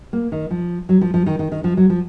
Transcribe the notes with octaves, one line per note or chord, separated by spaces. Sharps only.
A#3
D#3
F3
F#3
F3
F3
D#3
D#3
D#3
F3
F#3
F3